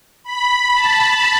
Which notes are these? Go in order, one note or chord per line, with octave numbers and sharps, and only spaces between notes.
B5
A5